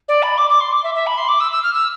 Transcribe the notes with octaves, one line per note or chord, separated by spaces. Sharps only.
D5
B5
D6
D6
C6
D6
E5
E5
B5
C6
D6
E6
E6
F6
E6